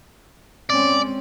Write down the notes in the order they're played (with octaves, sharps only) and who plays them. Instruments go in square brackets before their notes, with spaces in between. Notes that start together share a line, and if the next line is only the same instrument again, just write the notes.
[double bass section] G#3 C4 C#4 [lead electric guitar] D5